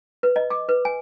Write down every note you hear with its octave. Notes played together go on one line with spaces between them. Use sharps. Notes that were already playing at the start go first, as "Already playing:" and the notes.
B4
D#5
D6
B4
G#5